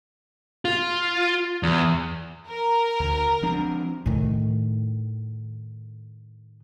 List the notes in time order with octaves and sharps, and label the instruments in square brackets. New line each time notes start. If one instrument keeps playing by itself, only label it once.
[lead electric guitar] F4
E2
[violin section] A#4
[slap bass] D2 D3
F3 C4 D4
[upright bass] A2 D#3